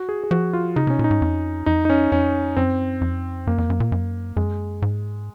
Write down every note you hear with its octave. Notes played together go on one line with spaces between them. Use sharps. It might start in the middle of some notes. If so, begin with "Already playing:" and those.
Already playing: F#4
G#4
G#4
F3 F#4
F4
C#3 D#4
C3 C#4
A#2
D#4
G#2
F2
F2 D#4
D#4
C#4
F2 C#4
F#2 C4
F2
F#2 A#3
F2
F#2
A#2
F#2
F#2 G#3
G#2